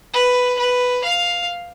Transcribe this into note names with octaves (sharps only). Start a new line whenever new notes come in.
B4
B4
F5